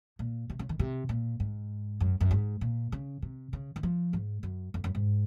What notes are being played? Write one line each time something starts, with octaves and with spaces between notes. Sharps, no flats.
A#2
C3
C#3
D#3
C3
A#2
G#2
F#2
F#2
G#2
A#2
C#3
C3
C#3
D#3
F3
G#2
F#2
F2
F#2
G#2